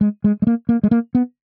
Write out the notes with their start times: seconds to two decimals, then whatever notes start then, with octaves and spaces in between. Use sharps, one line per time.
0.01 G#3
0.24 G#3
0.42 G#3
0.47 A#3
0.69 A#3
0.83 G#3
0.91 A#3
1.15 B3